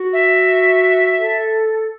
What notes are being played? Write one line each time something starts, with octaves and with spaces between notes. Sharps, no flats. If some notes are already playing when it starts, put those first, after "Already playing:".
Already playing: F#4
E5
A4